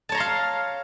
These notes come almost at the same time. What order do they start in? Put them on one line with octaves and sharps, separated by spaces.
A5 C#5 A#5 C6 F5